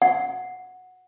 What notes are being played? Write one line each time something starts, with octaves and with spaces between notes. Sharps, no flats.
F#5